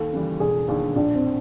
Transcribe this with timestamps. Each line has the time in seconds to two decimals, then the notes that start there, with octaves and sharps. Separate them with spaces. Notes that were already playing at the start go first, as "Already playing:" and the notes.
Already playing: D#2 A4
0.13 C#3 E3 G3
0.40 E1 G#4
0.68 D#2 D3 G#4
0.96 A#1 D4
1.15 C4